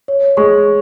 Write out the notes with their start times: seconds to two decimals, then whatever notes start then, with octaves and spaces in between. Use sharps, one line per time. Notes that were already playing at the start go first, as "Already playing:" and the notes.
0.08 C#5
0.37 G#3 C#6